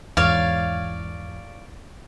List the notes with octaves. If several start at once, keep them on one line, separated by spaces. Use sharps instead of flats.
E2 G#2 C#5 D5 F5